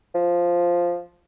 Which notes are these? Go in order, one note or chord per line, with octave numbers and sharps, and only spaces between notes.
F3